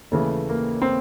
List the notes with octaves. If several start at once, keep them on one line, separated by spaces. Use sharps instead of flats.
D#2 C#3 E3 A3
A#3
C4